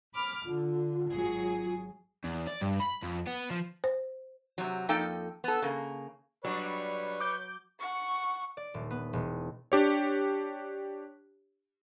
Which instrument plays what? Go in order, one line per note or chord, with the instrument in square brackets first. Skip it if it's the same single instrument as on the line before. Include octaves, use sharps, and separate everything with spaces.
[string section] B5 D6 F6
[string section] D3 [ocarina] F4
[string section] G#1 F#3 G#4
[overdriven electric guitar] E2
D5
G2
B5
F2
B3
F3
[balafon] C5
[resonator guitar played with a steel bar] C3 F#3
F2 A#3 D#4 A4 G5
B3 A4
C#3 A#3
[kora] F#3 [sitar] G3 D4 [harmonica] B4 C#5
[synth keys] D6 G6
[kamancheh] F#5 C#6
[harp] D5
D#1
B3
E1
[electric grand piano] D4 G4 C#5